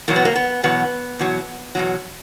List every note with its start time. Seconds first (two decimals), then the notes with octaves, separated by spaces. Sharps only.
0.08 E2 B2 F#3 A#3
0.16 B3
0.25 A#3
0.36 B3
0.63 E2 B2 F#3 B3
1.19 E2 B2 F#3
1.75 E2 B2 F#3